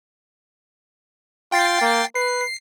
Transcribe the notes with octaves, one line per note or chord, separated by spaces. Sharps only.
F4 G5 A6 C7
A#3
B4 C7